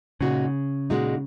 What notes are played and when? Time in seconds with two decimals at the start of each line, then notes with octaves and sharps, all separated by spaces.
0.21 A#2 C#3 G#3 D#4 F#4
0.90 A#2 G#3 D#4 F#4